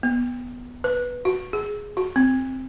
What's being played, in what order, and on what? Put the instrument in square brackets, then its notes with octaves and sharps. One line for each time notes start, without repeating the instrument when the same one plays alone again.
[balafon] B3
B4
F#4
G#4
F#4
C4